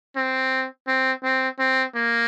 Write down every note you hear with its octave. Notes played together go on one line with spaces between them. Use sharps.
C4
C4
C4
C4
A#3